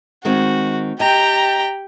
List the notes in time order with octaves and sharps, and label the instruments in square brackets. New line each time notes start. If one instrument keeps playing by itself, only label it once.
[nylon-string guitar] D#3 G#3 C4 [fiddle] F#4
[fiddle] G4 G5 [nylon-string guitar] D#5 [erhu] A#5